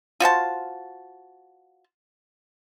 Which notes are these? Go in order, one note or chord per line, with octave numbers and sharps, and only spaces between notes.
F4 F#4 C5 A5